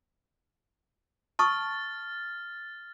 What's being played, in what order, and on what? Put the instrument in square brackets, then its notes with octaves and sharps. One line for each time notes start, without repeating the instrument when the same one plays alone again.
[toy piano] A5 C#6 D#6 [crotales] F6 A6